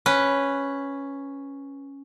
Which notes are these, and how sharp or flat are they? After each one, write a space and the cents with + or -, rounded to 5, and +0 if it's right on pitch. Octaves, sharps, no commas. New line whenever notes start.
C#4 +0 B4 +0